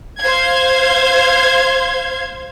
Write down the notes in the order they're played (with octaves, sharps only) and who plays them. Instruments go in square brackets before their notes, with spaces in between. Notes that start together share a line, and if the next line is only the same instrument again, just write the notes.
[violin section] C5 F5 G#6